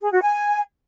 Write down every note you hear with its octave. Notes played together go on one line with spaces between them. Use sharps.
G#4
F#4
G#5